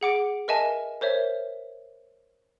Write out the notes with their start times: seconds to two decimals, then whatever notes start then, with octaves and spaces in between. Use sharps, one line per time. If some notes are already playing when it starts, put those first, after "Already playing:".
0.01 G#4 F#5 D6 D7
0.48 A#4 B4 D#5 E5 G#5 A5
1.01 A#4 C5 C#5 E5